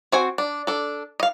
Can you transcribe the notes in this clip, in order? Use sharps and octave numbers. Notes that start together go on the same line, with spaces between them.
C4 F#4 G#5
D4
D4 A4
D#5 F5